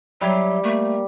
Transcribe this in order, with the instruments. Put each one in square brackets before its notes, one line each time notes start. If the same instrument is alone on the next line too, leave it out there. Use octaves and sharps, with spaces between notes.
[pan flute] F#3 [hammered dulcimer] G3 [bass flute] E5
[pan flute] A3 [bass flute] A#3